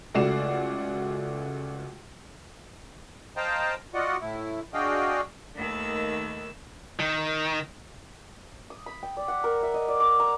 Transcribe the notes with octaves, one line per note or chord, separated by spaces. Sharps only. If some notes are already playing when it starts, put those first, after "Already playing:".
C#2 A3 F#4 D5 C7 E7
C5 D#5 F5 G5 A5 A#5
F4 F#4 D5 D#5 F#5
A2 E4
D4 F#4 G#4 D#5 F5 G5
D#2 D#3 A3 B4 E6
D#3
D#6
B5
G5
D5
F#5
A#4
E5
D#5
D5
D6
A#5